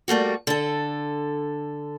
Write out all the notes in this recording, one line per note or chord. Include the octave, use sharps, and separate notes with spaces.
G3 A3 A#3 F#4
D3 A4